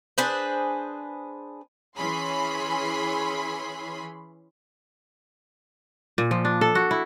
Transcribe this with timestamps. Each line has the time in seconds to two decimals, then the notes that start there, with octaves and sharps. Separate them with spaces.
0.18 D4 G#4 B4 C5
1.97 E3 C#4 G#4 B5 C6
6.18 A#2
6.31 F3
6.45 D4
6.61 A4
6.75 F#4
6.91 E4